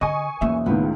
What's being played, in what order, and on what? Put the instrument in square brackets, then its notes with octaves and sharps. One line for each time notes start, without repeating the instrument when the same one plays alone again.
[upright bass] D3 [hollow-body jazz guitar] D#5 [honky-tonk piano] G#5 C#6 D#6
[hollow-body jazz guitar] B1 E2 E5 [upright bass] A#3 C#4
[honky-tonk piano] C#2 A2 D#3 [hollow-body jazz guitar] B3